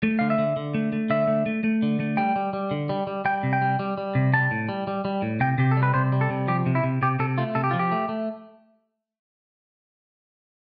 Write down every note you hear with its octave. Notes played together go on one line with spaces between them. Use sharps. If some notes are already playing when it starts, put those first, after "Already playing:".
A3
D3 F5
E5
D3
D3
A3
A3
D3 E5
A3
A3
A3
D3
A3
G3 G5
G3
G3
D3
G3
G3
G3 G5
C3
G5
G3
G3
G3
C3
G3 A5
A2
G3
G3
G3
A2
C3 G5
C3 G4
A4
G3
B4
C3 C5
G3
A4
C3
F3 G4
C3
E4
C3
C3 G4
C3 A4
A3 F4
C3 A4
G4
F3 F4
G4
A3
A3